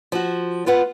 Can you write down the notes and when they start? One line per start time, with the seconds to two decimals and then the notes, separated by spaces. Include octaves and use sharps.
0.12 F3 F#4
0.66 B3 F4 B4 F#5